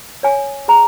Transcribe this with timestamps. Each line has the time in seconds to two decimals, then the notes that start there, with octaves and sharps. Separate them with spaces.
0.23 C#5 G#5
0.68 G#4 A#5